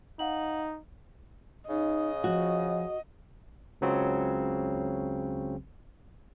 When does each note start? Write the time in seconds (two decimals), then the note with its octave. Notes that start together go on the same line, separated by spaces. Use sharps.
0.19 D#4 F5 F#5 F#7
1.69 C#3 D#4 D#5
2.24 F3 F#4
3.81 C#2 C#3 F#3 C4